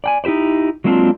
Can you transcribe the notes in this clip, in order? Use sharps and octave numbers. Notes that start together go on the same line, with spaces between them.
D5 G5 G#5
D#4 E4 G4 C5 D5
F#3 G#3 A#3 C4 D4 F4